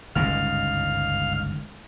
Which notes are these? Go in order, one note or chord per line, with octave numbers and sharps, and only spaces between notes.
G1 C#2 G#2 F5 F6